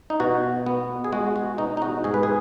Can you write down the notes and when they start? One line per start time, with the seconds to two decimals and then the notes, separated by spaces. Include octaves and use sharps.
0.10 D#4
0.20 B2 F#4
0.66 B3
1.04 G#4
1.12 G#3 F#4
1.36 F#4
1.58 B2 D#4
1.77 D#4
1.82 F#4
2.04 G#2 G#4
2.14 B4
2.23 G#4